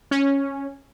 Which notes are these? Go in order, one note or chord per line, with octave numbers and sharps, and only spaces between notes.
C#4